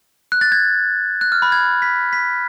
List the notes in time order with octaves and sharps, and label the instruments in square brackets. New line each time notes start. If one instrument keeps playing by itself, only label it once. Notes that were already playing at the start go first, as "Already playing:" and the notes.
[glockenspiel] F#6
A6
G#6
F#6
F6
B5
G#6
B6
B6